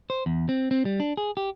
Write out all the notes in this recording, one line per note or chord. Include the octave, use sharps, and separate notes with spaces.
C5
E2
C4
C4
G3
D4
G#4
G4